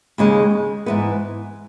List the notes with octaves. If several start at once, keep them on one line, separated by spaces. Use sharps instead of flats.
D#2 C#3 G#3
G#2 E3 B3